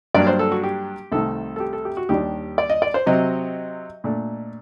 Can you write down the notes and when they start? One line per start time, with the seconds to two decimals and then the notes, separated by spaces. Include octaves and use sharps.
0.15 G2 F#3 A#3 D4 D5
0.27 C5
0.39 A4
0.52 F#4
0.63 G4
1.12 C2 C3 D#3 A3 A4
1.56 A4
1.60 G4
1.73 A4
1.85 G4
1.97 F#4
2.09 D#2 D#3 G3 D4 G4
2.58 D5
2.70 D#5
2.82 D5
2.94 C5
3.06 C3 F#3 C4 D#5
4.04 A#2 A3 D4